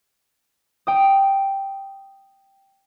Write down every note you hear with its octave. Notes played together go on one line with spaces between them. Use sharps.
G5 D#6